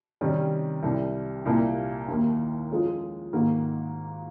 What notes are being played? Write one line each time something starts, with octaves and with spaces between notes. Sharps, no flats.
C3 D#3 G3 C#4
C2 C3 G3
C2 A#2 G3 A#3
D#2 D#3 A#3
F3 G#3 C#4 F4
G#2 D#3 A#3